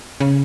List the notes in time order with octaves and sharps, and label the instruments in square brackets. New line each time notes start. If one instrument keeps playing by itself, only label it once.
[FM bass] C#3